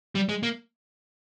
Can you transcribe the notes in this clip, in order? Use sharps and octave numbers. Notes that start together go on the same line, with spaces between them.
G3
G#3
A#3